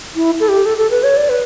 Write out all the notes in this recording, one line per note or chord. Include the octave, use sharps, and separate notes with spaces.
E4
A4
G4
A4
A4
B4
C#5
D5
B4